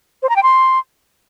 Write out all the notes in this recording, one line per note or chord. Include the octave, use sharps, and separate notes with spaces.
C5
A#5
G5
C6